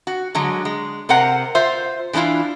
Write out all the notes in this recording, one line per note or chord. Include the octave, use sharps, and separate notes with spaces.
F#4
D3 F#3 G#3
G#3
C3 A#4 C5 F#5
F4 C5 E5
E3 G#3 D4 E4 F4